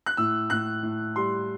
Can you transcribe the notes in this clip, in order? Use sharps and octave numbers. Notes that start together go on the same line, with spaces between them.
F#6
A2 E6
A2 F#6
A2
G3 C6